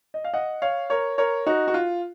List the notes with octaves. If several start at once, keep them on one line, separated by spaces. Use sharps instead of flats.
D#5
F5
D#5 F#5
C#5 F5
A#4 C#5
A#4 C#5
D#4 F#4
F#4
F4